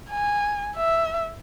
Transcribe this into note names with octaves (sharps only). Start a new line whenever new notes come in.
G#5
E5